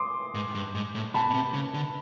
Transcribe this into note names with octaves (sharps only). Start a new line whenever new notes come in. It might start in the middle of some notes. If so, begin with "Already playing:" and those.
Already playing: C6 D6 D#6
G#2
G2
G#2
A2
B2 A5 B5
B2
C3
C#3
D3